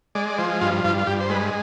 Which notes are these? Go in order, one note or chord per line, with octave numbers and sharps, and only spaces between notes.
G#3 D5
D5
F3 C5
G2 F4
G2 F4
F4
G2 G4
C5
G#3 B4